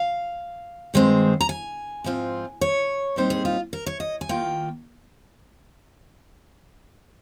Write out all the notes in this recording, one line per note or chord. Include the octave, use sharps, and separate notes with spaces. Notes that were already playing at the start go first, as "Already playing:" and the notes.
Already playing: F5
G2 D#3 G#3 C4
A#5
G#5
G#2 F3 C4 F4
C#5
A#2 G3 C4 D#4 C5
G#4
F4
A#4
C#5
D#5
G#5
D#3 A#3 F4 G5